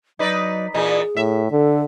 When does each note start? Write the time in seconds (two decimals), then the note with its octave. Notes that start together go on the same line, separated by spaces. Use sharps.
0.19 F#3 D#4 B4 D5
0.74 A#2 E3 D#4 G#4
1.17 A2 E5
1.51 D3 A4